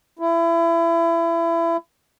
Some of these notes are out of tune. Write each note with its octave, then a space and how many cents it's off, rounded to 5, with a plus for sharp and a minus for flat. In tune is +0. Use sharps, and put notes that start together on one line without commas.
E4 +30